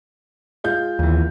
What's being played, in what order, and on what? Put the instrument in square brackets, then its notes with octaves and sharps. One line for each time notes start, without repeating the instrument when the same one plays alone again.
[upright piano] G#3 F4 G6
[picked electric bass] D#2 E3